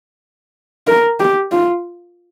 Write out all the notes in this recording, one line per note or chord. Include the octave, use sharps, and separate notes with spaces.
A#4
G4
F4